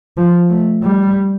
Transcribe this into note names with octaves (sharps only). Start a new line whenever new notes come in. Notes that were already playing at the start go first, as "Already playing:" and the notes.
F3
A3
G3